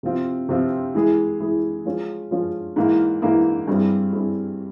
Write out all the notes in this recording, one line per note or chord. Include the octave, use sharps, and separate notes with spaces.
C3 F3 C4 F4
C3 F3 C4 F4
E3 G#3 E4 G#4
E3 G#3 E4 G#4
F3 G#3 C#4 F4
F3 G#3 C#4 F4
G#2 E3 A#3 E4
G#2 E3 A#3 E4
G2 G3 C4 E4 G#4
G2 G3 C4 E4 G#4